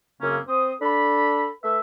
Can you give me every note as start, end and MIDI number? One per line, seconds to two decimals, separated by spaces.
0.22 0.38 42
0.22 0.38 49
0.22 0.38 58
0.22 0.38 60
0.22 0.38 61
0.48 0.72 60
0.48 0.72 72
0.48 0.72 87
0.82 1.49 62
0.82 1.49 69
0.82 1.49 83
1.64 1.80 57
1.64 1.80 71
1.64 1.80 76